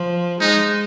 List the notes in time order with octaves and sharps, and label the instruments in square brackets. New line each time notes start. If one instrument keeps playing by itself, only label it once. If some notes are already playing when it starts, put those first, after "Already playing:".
Already playing: [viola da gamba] F3
[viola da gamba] G#3 [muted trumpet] D#4